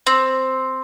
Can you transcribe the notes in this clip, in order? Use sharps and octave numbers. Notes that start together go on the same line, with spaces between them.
C4